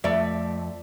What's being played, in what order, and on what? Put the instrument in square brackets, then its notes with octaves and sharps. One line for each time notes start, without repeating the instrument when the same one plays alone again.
[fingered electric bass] F2 [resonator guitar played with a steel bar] A3 E5 [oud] D5